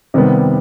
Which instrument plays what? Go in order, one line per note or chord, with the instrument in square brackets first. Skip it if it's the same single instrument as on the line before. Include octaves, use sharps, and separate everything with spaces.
[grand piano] C3 D#3 G3 B3